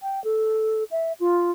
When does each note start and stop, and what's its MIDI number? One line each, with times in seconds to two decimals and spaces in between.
0.02 0.23 79
0.24 0.84 69
0.91 1.13 76
1.20 1.52 65